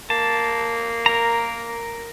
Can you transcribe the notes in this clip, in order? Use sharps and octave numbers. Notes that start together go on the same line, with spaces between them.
A#3 A5
A#4 A#5